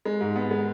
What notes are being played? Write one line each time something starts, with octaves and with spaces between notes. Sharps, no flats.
G#3
G#2
B3
G#3